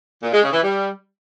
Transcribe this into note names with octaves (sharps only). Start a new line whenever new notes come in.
A#2
G#3
C#3
E3
G3